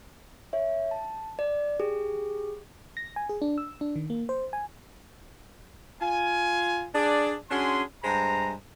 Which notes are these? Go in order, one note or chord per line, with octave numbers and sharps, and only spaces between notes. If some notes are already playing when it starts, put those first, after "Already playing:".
C#5 E5
A5
D5
G4 G#4
A#6
G#5
G#4
D4
E6
D4
D#3
A#3
C5
G#5
F4 G#5
D4 G#4 D5
C#4 D4 F#4 G#4 C6
G2 G#3 C5 A#5